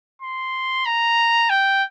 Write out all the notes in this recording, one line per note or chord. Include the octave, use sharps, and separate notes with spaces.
C6
A#5
G5